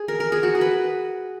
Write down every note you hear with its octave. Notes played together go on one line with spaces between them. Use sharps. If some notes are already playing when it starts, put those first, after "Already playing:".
Already playing: G#4
A#4
A#4
G#4
F#4
G#4
B4